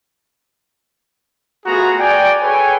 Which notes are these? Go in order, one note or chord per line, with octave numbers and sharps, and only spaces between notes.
A3 B3 F4 F#4 G#4 A#5
D5 G5 G#5
G#4 A4 B4 C#5 G5 G#5